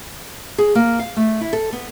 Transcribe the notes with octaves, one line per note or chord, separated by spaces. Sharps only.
G#4
A#3
F5
A3
E4
A4
B3